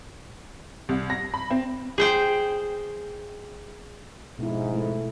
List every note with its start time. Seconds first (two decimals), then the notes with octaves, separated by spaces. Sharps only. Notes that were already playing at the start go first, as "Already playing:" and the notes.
0.89 C2
1.10 A#6
1.34 B5
1.51 C4
1.98 G#4 C5 G5
4.39 F2 G#2 B2 E4
4.74 A3 E4